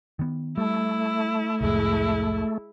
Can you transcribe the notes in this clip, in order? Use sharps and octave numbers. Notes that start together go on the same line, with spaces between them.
D#3 B3
G3 A3 E4
C2 F2 A2 G#3 E4